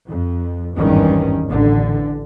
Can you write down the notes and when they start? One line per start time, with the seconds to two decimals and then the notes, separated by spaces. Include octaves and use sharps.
0.10 F2
0.76 G#1 E2 G2 D#3 C#4
1.50 A1 D3